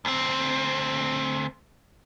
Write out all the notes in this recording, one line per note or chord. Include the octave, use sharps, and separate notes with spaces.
D2 C4